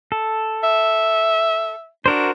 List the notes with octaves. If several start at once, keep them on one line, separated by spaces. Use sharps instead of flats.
A4
E5
D4 F#4 A#4 C5